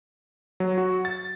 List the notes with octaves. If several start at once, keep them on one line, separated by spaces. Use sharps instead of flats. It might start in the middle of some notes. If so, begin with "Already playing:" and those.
F#3
F#4
A6